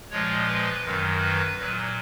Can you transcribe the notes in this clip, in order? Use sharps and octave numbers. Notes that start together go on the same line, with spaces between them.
A#2 F3 G#3 C#5
B4
F#2 D#3 F#3
B4
A#2 F#3